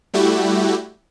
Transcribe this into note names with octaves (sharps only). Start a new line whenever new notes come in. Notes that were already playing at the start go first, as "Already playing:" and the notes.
G3 A3 E4 F#4 G4